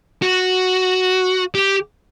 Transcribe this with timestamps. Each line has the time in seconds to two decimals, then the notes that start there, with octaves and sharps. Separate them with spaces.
0.23 F#4
1.55 G4